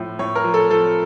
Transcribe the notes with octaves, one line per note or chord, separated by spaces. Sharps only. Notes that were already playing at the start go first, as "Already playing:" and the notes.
Already playing: A2 F3
A2 C#5
A#4
F3
A4
F3 A4